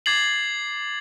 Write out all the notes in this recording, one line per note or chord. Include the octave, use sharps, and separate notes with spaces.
D6 G#6 A6 C7 F#7